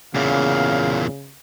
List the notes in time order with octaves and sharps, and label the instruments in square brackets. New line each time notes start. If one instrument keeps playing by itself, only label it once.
[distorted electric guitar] E2 A#2 [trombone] C#3 [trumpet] F5